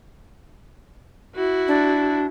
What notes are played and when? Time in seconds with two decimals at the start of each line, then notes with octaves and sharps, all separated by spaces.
1.35 E4 F#4
1.68 D4